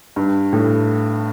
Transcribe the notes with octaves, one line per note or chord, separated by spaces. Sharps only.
G2
A2